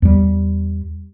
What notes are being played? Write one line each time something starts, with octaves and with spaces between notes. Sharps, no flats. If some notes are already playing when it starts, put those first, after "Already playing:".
E2 G3